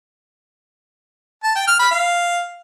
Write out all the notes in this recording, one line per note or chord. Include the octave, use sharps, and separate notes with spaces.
A5
G5
F6
B5
F5